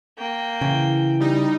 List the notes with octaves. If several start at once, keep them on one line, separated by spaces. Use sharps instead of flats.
A#3 G5
C#3 E3
G3 D#4